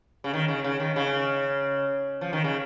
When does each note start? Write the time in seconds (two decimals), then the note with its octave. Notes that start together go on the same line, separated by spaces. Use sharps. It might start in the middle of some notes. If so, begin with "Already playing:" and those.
0.24 C#3
0.33 D#3
0.48 C#3
0.64 C#3
0.80 D#3
0.96 C#3
2.21 F3
2.33 D#3
2.44 C#3